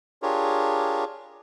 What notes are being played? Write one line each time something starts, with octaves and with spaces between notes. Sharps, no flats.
D4 F4 G4 G#4 A#4 C#5